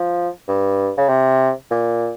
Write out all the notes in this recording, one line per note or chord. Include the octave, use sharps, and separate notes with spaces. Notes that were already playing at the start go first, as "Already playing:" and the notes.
Already playing: F3
G2
C#3
C3
A#2